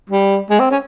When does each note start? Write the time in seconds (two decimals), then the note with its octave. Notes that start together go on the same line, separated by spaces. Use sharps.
0.10 G3
0.50 G#3
0.60 C4
0.71 C#4